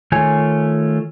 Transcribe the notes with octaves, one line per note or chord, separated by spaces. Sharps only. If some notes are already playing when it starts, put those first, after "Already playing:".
D#3 A3 F4 C#5 G#5